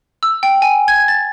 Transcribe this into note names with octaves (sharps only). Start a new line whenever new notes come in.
E6
G5
G#5
G#6
A6